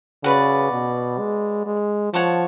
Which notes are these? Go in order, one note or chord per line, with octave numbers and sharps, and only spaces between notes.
C#3 F#4 B4 D5
B2
G#3
G#3
F3 C#5 F#5 A5 C#6